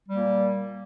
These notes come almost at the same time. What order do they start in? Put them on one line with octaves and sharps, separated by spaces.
G3 A#3 A#2